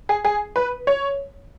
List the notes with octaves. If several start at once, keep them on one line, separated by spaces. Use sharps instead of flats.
G#4
G#4
B4
C#5